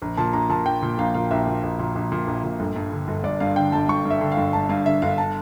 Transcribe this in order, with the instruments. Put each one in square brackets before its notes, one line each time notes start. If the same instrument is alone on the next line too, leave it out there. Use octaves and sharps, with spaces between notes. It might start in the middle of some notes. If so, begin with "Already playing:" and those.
[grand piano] A#1
A#2 A5
A#1 A#5
A#2 A5
A#1 G5
A#2
A#1 F5
A#2 F5
A#1 E5
A#2
A#1
A#2
A#1
A#2
A#1
A#2
G1
G2
D3
G1
G1 D5
G2 F5
D3 G5
G1 A5
G1 C#6
G2
E5
D3
F5
G1
G1 A5
G2 F5
D3 E5
G1 F5
A5